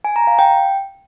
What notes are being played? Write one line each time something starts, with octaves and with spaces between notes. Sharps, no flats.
G#5
A#5
F5
G5